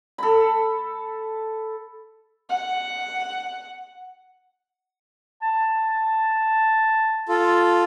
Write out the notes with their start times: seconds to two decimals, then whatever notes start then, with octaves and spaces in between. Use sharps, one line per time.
0.18 A4 B5
2.49 F#5
5.42 A5
7.29 F4 A4